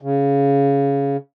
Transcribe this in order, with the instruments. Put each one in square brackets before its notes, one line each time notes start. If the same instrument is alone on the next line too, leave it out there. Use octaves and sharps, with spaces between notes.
[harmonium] C#3